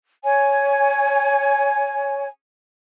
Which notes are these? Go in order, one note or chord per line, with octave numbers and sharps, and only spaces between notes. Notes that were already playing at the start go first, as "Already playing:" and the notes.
C#5 G#5